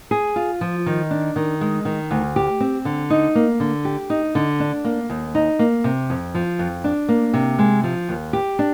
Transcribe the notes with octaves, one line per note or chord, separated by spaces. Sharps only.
G#4
F4
F3
D#3
D4
D#3
G#3
D#3
D2
G4
C4
D3
D#4
A#3
D3
G4
D#4
D3
D4
A#3
D#2
D#4
A#3
C3
F2
F3
F2
D4
A#3
C3
G#3
F3
D#2
G4
D4